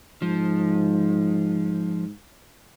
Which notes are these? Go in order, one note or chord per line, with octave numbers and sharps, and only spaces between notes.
G#2 F3